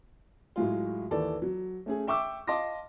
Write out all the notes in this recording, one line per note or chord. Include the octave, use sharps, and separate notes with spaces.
A2 F#3 G#3 F4
D#2 E3 A4 D5
F#3
A3 C#4 G#4
E5 G5 C#6 D6 E6
D#5 F5 A5 C6 D6 A#6